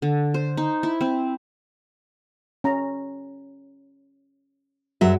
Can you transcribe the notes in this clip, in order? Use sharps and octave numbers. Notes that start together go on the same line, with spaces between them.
D3
C5
D#4
E4
C4
C#4 A#5
F#2 F#3 G3 F#4 G#4 E5